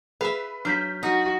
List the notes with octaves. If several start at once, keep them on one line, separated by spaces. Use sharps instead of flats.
G#4 B4 E5 F5
F#3 D4 F6 G6 B6
D#4 F#4